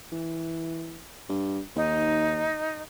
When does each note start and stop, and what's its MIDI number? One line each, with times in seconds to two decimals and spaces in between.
0.13 1.02 52
1.29 1.60 43
1.76 2.50 39
1.76 2.82 63